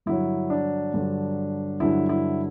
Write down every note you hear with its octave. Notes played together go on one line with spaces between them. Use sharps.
G2 D3 F#3 E4
D4
G2 D3 F#3
G2 D3 F#3 E4
E4